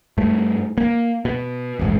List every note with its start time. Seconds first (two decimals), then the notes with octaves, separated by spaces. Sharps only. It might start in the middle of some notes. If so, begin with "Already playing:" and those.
0.18 G2 A3
0.78 A#3
1.25 B2
1.79 E1 A1 G#2